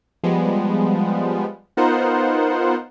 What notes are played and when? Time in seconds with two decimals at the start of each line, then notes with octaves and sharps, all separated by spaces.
0.23 F3 G3 G#3 B3
1.77 B3 D#4 F4 A#4 C5 F#5